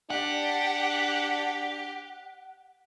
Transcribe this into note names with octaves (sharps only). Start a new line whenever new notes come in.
D4 G4 F#5